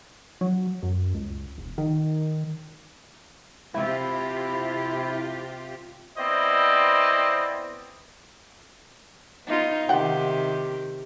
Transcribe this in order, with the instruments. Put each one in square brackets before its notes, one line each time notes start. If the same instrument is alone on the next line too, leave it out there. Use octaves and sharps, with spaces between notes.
[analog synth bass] F#3
F#2
C#2
E1
D#3
[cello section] C3 F4 G4 [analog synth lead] E4
[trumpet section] B3 C4 E4 C5 D5 D#5
[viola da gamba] B3 D#4 F4
[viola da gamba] C3 D#3 G4 [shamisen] F#5 G5